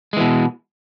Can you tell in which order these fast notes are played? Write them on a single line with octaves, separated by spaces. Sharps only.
G#3 E3 B2